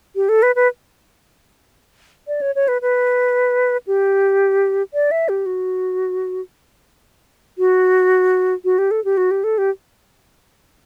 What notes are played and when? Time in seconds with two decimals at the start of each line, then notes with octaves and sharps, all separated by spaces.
0.16 G4
0.29 A4
0.43 B4
0.56 B4
2.28 D5
2.41 C#5
2.55 C#5
2.68 B4
2.82 B4
3.87 G4
4.94 D5
5.11 E5
5.29 G4
5.46 F#4
7.58 F#4
8.65 F#4
8.78 G4
8.91 A4
9.05 G4
9.17 F#4
9.31 G4
9.44 A4
9.58 G4